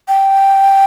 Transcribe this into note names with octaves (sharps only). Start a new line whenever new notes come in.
G5